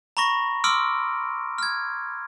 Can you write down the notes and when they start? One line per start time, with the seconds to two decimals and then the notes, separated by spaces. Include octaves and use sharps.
0.17 A#5 B5 C#6 A#6
0.64 C6 D6 E6 F6 D7
1.58 F6 G#6